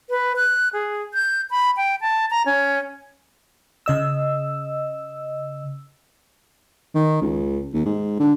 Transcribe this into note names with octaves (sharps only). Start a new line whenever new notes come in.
B4
F#6
G#4
G6
B5
G5
A5
A#5
C#4
C#3 D#5 E6
D#3
C#2
D#2
G#2
D3